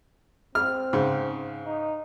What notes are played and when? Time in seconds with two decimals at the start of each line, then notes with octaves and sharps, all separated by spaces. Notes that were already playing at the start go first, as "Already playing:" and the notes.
0.55 C4 F6
0.93 G#2 C#3
1.66 D#4